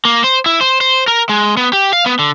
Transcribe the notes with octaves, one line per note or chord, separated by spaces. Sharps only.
A#3
C5
E4
C5
C5
A#4
G#3
B3
G4
F5
B3
D3